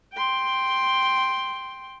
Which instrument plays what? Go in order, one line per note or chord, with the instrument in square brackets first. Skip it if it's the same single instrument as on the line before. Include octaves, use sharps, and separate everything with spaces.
[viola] G5 C6